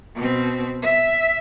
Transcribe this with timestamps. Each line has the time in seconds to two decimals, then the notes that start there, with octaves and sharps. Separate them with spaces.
0.16 B2 C4
0.82 E5